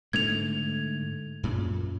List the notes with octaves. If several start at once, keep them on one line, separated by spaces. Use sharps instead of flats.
G#2 D3 A3 G#6 F7
F#2 A#2